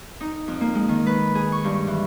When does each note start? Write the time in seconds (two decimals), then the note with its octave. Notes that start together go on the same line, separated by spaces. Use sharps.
0.21 D#4
0.48 F2
0.61 A#3
0.75 G#3
0.89 D#3
1.06 B4
1.35 G#4
1.52 C#6
1.64 G2
1.87 E3